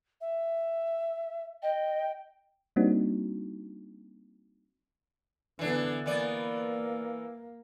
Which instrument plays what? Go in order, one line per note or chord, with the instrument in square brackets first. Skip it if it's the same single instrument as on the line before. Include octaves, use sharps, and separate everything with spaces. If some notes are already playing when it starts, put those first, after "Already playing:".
[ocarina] E5
[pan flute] D#5 [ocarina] G5
[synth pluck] G3 A#3 C4 D4 D#4 F#4
[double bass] D3 B3 [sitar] E3 D4
[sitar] E3 B3 D5 [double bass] A#3